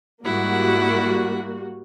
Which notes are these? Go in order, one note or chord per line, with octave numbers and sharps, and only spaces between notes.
G#2 G3 A#3 E4 F#4 F#5